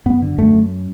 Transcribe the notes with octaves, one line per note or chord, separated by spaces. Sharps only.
F#2 B3
D3
F#2 A3
F#2